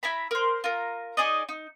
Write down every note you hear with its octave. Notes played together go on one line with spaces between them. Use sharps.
E4 E5 A#5 B5
A#4 C5
F4 A#4
D#4 G#4 D5 D#5
D#4